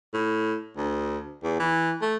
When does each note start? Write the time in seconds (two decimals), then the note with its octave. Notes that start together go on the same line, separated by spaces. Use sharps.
0.13 A2
0.77 D2
1.43 E2
1.60 E3
2.02 A3